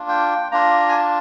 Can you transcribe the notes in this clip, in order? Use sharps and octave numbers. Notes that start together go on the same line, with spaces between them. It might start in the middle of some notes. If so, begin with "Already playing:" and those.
Already playing: A#3 D4 F4
G5
A#3 D4 F4 A#5
G#5
A5